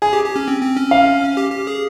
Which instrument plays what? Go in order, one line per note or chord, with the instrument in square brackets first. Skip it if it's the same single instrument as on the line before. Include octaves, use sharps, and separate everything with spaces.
[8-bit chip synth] G#4 [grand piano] G#5
[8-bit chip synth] G4
G4
C#4
C4
C4
C#4
[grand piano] F5
[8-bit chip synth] G4
G4
G#4